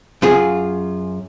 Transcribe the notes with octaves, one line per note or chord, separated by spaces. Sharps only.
F#2 F4 G#4